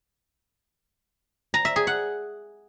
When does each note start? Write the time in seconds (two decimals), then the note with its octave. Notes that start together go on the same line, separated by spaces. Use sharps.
1.54 A#5
1.65 E5
1.76 G#4
1.87 F#5